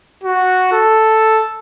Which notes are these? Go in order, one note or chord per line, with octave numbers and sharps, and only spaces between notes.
F#4
A4